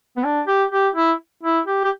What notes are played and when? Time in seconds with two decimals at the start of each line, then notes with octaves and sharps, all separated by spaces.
0.16 B3
0.24 D4
0.47 G4
0.71 G4
0.95 E4
1.43 E4
1.67 G4
1.84 G4